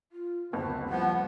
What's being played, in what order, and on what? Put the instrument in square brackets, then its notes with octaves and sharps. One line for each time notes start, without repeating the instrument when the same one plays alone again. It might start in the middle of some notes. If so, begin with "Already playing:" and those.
[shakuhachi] F4
[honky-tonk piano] F#1 [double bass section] D2 B3 C4 [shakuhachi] A5
[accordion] F3 B3 [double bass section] G3 [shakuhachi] F#5